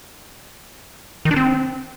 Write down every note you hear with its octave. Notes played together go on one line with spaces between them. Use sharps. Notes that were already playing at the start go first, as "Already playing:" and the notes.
D#3
D4
C4